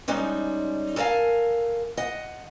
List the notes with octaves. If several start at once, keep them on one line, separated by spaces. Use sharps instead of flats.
G3 G#3 C#4 D#4
A4 A#4 D5 F5 G#5
D#5 F#5